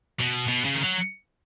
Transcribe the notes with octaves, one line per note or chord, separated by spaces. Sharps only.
B2
B2
C#3
D#3
F#3